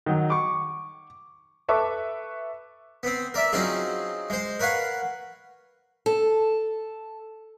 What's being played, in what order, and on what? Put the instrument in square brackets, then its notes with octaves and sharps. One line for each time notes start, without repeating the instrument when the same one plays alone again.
[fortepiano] D#3 F#3
C#6 D6
[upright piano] A4 B4 E5 C#6 D6
[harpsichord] B3 C4
A#4 D5 E5
F#3 C4 C#4 D#4 F4 G#4
G#3 C5
A#4 B4 C#5 F5 F#5
[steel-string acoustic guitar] A4